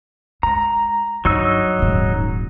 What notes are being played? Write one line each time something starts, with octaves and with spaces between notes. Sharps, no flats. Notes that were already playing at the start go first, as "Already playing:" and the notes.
G#3 A#5
G2 F#3 D#4 E6
D#1 G#2